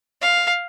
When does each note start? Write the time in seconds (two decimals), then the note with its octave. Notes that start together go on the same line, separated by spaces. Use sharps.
0.22 F5